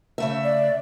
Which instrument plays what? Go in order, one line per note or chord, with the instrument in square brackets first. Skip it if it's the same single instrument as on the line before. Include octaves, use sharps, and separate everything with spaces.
[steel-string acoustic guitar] C#3 A3 E5
[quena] D5